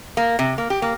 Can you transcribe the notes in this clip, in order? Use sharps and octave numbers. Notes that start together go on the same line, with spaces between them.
A#3
C3
A#3
G4
A#3